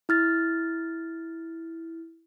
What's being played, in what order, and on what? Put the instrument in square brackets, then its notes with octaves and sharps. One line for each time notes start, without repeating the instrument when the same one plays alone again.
[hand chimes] E4 F6 A6